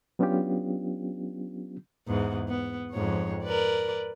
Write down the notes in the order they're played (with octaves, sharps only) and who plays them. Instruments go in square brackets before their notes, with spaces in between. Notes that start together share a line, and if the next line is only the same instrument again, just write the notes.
[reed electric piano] F#3 B3 C#4 D4 F4 G4
[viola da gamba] E2 G#2 B3
B3
F2 G#2 C#5
A#4 B4 D5